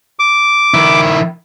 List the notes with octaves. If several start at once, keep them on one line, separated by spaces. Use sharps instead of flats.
D6
D#3 E4